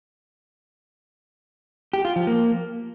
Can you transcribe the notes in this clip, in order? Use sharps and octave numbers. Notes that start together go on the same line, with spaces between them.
G4
F4
F3
A#3